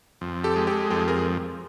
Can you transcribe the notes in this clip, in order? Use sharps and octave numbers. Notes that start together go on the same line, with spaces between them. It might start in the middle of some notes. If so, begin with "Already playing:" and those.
F2
G4 A4
G#3
G4 A4
F2 G4 A4
G#4 A#4